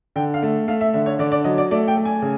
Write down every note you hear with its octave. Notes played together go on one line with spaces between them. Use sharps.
D3 G5
F5
A3
A3 F5
E5
D3 E5
C#5
D3 D5
D5
F#3 D#5
D5
A3 D5
G5
A3
G#5
C#3